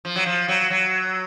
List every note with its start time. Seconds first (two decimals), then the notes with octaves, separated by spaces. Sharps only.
0.05 F3
0.16 F#3
0.26 F3
0.48 F#3
0.70 F#3